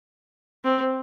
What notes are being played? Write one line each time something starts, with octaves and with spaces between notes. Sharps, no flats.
C4